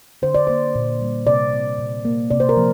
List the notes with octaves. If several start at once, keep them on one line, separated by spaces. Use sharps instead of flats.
D3 C5
D5
A#3 C5
A#2
G3 A#3
C3 D5
A#3
A#2
A#3
C3 D5
C5
A#4
F3 A#3